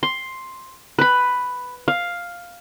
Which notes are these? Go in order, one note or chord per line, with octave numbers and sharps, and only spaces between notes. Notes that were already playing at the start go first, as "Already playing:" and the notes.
C6
B4 B5
F5